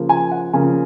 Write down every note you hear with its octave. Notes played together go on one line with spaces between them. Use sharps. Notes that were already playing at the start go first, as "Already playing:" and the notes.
Already playing: C#3 F3 A#3
G#5
F#5
C#3 F3 A#3 G#5